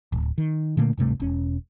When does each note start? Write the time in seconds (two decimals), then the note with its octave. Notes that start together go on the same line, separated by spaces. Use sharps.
0.12 D1
0.38 D#3
0.77 A#2 D3 A3 A#3
0.98 D1 G2 C3 A3
1.20 E1 C#4